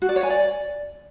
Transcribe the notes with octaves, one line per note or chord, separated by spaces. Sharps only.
F#4
D5
C#5
G#5
D5